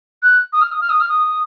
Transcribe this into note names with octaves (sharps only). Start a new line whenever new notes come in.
F#6
D#6
F6
D#6
F6
D#6
F6
D#6